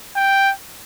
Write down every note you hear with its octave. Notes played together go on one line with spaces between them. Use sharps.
G5